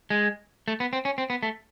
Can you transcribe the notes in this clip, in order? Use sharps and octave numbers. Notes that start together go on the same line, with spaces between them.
G#3
A3
B3
C4
C#4
C4
B3
A3